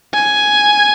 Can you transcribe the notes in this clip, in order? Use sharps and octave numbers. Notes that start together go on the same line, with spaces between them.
G#5